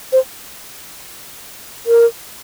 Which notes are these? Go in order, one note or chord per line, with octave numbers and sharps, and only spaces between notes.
C5
A#4